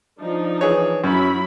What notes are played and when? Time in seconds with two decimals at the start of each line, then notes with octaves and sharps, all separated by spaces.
0.21 F3 D4 D#4
0.61 E3 G#4 C#5
1.04 F#2 F#3 E4 B5